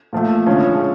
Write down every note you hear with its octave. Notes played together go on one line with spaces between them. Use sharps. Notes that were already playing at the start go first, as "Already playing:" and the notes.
A#2 F3 A3
D3 F3 G#3 C#4 E4